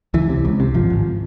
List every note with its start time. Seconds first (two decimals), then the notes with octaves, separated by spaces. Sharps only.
0.14 C#2 E3
0.29 C3
0.45 C#2
0.60 C3
0.74 G#1 F3
0.90 G#1